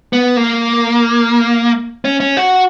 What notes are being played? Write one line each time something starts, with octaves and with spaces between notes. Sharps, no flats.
B3
A#3
C#4
C#4
F#4